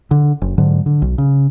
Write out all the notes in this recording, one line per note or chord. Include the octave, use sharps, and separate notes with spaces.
D3
F#1
G#2 D3 F#3
D3
B1
C#3